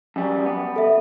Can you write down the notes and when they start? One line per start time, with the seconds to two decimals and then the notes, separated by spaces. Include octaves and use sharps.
0.16 F#2 G3
0.46 B3
0.76 A4 E5